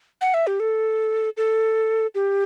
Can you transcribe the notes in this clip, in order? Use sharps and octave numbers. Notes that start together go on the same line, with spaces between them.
F#5
E5
G4
A4
A4
G4